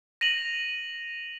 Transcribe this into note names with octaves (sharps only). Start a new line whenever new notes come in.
A#6 D#7 F7 F#7